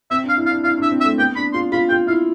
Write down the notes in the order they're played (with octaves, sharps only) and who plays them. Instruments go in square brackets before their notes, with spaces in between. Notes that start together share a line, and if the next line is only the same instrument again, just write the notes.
[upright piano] C4 [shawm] E5
[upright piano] D4
[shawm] F5
[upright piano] E4
[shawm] F5
[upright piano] D4
[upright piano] E4 [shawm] F5
[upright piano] D4
[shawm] E5
[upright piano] C4
[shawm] E5
[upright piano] A3
[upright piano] B3 [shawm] G5
[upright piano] D4 [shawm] B5
[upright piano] F4 [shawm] C6
[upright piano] F4 [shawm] B5
[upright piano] F4 [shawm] G5
[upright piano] E4 [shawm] F5